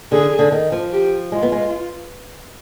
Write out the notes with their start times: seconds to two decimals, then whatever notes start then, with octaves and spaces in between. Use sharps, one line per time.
0.12 D3 G#4
0.39 D3
0.52 D#3
0.72 F3
0.92 G4
1.32 G#3 F4
1.42 B3
1.52 G#3